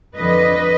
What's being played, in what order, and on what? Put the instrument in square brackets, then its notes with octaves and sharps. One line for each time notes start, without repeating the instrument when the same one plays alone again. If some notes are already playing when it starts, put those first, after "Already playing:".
[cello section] F2 D3 F3 B4 D#5